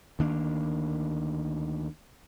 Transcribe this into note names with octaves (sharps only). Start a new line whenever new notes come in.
D2 D#3 A#3 D4